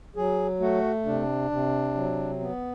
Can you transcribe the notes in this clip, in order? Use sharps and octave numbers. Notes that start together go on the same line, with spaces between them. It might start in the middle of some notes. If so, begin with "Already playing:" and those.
F#3 G#4
A3 F#4
C3 D4
C3
F#3
B3